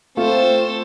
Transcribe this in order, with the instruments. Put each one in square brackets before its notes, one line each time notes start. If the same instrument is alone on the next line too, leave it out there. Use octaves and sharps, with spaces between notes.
[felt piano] A3 [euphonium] C4 [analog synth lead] F4 [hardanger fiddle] A4 C5